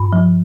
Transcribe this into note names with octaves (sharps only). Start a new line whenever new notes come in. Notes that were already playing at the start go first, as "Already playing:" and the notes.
Already playing: G2 B5
F3